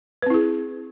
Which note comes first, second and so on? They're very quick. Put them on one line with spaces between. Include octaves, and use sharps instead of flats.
B4 C4 E4 G#4